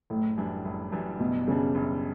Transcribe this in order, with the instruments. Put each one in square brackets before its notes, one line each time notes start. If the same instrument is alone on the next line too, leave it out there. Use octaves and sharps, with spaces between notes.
[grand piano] F#1 [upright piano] A2
[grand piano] F#2 E3 G3 D4
F#1
F#2 E3 G3 D4
[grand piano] F#1 [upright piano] B2
[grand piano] F#2 E3 G3 D4 [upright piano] C#3
[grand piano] F#1